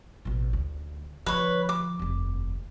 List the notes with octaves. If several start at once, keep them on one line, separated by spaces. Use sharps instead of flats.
A1 B2
D2
D3 F3 B4 C#5
D6
F1 D#2